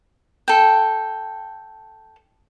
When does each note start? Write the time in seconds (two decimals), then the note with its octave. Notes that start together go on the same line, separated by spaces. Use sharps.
0.48 A4 G5